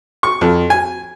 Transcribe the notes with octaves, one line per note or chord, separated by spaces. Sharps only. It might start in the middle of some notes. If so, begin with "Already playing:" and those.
C#6
F2
G#5